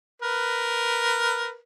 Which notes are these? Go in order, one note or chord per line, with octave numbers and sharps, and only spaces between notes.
A#4 B4